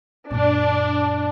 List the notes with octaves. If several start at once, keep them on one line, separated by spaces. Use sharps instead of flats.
F#2 A#2 D4